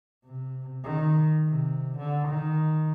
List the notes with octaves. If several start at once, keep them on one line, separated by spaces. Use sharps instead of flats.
C3
D#3
C3
D3
D#3